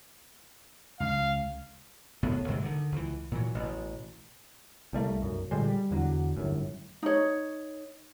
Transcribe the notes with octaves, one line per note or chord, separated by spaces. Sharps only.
C#2 F5
F#1 A2 B3
C2 G#2 C3 E3
D3 D#3
C#2 E3
A#2 E3 F#3
A1 B2
C2 G3 A3 A#3
B1 F#2
A#2 D3 G3 G#3
G3
E2 D3 F#3
G1 F#2 A2
D#4 C#5